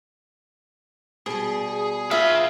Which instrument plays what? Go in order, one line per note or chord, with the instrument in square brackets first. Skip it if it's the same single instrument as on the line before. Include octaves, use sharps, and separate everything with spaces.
[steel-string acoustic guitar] B2 G3 [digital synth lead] G#4
[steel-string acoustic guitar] F4 B4 [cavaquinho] E5 [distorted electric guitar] F5 B5